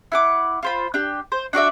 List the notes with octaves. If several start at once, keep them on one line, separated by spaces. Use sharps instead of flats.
E4 F#5 D6
F4 C5 B5
D4 G4
C5
D4 F#4 D5 E5